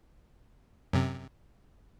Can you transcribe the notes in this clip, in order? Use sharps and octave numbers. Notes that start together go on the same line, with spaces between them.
F#2 C3